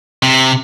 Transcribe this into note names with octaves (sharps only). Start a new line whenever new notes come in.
C3